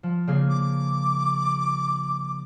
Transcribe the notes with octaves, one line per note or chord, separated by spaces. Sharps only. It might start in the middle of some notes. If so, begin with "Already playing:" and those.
F3
C#3 A#3 G#4
D6